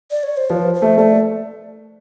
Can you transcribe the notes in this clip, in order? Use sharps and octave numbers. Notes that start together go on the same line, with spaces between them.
D5
C#5
C5
F3 B4
C5
A3
A3 D5